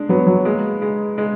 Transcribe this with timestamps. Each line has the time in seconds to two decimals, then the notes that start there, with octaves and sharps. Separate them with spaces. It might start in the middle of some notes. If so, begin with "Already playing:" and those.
Already playing: G#3 D4
0.09 F#3 B3
0.27 F#3
0.45 G#3 A#3
0.82 G#3
1.18 G#3